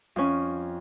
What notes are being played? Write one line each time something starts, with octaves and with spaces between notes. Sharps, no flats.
F2 C#4